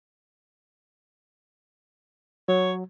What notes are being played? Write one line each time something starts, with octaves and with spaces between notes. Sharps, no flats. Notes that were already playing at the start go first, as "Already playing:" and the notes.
F#3 C#5